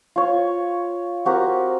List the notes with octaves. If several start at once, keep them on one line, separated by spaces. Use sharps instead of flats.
F4 C#5
C4 F#4 G4 A#4